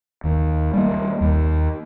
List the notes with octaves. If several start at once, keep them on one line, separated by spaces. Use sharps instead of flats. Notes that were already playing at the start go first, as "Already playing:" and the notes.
D#2
G3 A#3
D#2